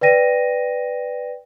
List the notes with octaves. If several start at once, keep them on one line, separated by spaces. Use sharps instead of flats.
B4 D5 G5 A#6 D#7